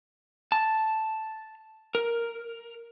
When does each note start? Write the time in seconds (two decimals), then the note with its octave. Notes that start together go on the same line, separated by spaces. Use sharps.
0.52 A5
1.95 A#4